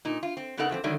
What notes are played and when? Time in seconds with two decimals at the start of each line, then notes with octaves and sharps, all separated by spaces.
0.05 A#2 D#4
0.23 F4
0.37 C4
0.57 C#3 B3 D#4 A4 A#4 F#5
0.69 E2 F3 G3 C4
0.84 D3 D#3 F#3 G3 A3